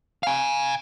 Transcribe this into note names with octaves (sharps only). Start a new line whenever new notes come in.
F5 G#5